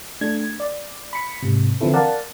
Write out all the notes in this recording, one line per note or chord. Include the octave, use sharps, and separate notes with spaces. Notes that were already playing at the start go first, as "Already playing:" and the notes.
A3 D4 G#6
D5
B5 C#7
G#2 C3
D3 E3 F3 C4 E4 A4
A#4 D5 F5 F#5 A5